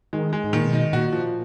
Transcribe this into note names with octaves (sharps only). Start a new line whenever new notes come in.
D#3 G#3
G#3
G#2
A#2 D#3
B2
D#4
A#2 F#4
F3